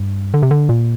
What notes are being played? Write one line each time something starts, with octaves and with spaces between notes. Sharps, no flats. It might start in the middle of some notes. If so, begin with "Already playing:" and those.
Already playing: G2
D3
C3
D3
A#2